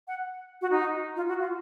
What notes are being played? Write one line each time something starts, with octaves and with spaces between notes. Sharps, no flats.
F#5
F#4
D#4
F4
F#4
F4